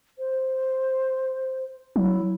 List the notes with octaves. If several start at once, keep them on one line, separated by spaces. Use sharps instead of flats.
C5
F#3 E4